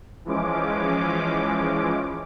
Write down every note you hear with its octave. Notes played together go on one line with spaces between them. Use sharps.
E3 F3 G#3 C#4 D6